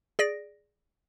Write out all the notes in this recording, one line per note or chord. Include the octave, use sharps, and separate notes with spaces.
G#4 D5 A#6 D7